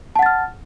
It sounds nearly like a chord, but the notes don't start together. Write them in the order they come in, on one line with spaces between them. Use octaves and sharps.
A5 F#5 A6 F6